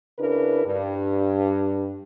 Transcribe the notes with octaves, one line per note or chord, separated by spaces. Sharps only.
C#3 D4 E4 A#4 B4
G2